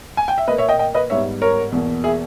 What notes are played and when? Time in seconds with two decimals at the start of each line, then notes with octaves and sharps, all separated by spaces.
0.17 G#5
0.28 G5
0.38 E5
0.47 A#2 B4 D#5
0.51 A#3
0.58 C#5 E5
0.69 D#5 G5
0.79 D#5 G5
0.94 B4 D#5
1.10 G#2 G3 B3 C#5 E5
1.42 A#4 C#5
1.72 E2 B2 A#3
2.04 E4 G#4